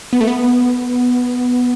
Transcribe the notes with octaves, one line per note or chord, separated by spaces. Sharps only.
B3
A3
B3